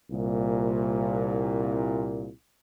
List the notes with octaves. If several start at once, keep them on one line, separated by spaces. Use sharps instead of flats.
C2 A#2